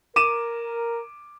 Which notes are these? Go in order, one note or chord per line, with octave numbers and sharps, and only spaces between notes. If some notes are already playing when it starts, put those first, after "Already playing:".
A#4 D6 D#7 E7